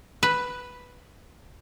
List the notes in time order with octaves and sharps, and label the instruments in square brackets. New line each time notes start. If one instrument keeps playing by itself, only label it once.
[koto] B4